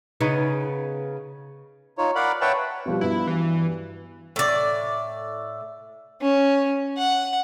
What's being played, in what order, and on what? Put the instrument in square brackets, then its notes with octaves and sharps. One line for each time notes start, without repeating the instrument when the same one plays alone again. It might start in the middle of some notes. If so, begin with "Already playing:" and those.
[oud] C#3 B3 D#4
[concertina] D#4 F4 C#5
A#4 D5 F5 F#5 B5
B4 C#5 E5 F#5 G5 A5
[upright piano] B2 F3 G3
[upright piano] G2 B3 F#4 [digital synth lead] E4
[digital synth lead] E3
[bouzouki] A2 D5
[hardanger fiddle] C#4
F#5